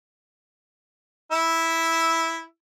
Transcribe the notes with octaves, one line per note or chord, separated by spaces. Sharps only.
E4 E6